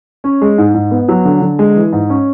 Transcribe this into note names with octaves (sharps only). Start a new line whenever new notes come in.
C#4
G#3
G#2
G#2
B3
F#3
D3
D3
G#3
E3
G#2
C#4